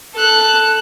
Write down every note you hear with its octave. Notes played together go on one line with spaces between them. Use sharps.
A4 F#6